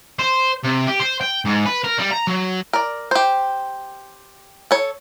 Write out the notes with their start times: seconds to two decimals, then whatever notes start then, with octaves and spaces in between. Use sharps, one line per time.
0.19 C5
0.64 C3
0.87 G4
1.00 C5
1.21 G5
1.45 G#2
1.66 B4
1.84 A#4
1.98 G3
2.11 A#5
2.27 F#3
2.73 A#4 D5
3.11 G4 C5
4.71 A4 C#5